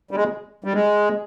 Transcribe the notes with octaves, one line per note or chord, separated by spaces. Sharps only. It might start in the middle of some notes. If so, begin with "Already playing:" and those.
G3
G#3
G3
G#3